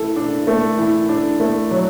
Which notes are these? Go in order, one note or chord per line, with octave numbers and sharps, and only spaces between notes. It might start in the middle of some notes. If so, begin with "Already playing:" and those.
Already playing: E3 A3 A4
D4
A3
E3
D4
A3
F#3